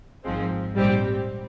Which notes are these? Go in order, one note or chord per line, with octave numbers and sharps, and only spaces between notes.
G#1 G#2 F3 G#3 C4
A#1 G#2 G3 C4 G4